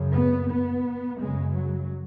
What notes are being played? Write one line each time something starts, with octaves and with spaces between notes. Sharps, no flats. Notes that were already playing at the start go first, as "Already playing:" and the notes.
Already playing: F#2 C#3
B3
B3
F#2 C#3 G#3
F#3